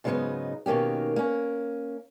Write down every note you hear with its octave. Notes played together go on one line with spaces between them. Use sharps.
G#2 C#3 F#3 G#3 B3 D#4
B2 D#3 A#3 C#4 G4
A#3 C#4